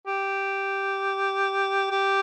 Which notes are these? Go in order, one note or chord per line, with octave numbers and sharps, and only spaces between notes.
G4
G4